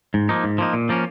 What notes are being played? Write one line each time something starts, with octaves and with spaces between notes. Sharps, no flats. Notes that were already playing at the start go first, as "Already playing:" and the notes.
G#2
F3 A#3 D#4
G#2
F3 A#3 D#4
A#2
F3 A#3 C#4